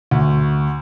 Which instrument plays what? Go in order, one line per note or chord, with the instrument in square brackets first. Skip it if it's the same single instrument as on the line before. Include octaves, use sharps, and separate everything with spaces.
[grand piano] D2